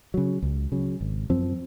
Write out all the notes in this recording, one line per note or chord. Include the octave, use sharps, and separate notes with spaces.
C#3 F#3
C#2
C#3 F#3
G#1
F#2 F3 C4